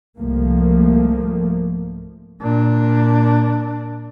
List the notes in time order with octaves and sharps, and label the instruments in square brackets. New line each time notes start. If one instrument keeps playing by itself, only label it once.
[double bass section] C2 G#2 F3 A3 A#3
[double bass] A#2 D4